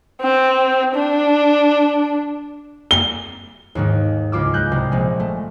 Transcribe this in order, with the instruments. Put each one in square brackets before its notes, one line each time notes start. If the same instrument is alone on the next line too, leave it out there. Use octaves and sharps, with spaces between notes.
[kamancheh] C4
D4
[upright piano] G7
[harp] D#2 G#2 D#3
C#2 F4 D6 E6
G#3 F#6 G6
C2
A#1 G#3
A3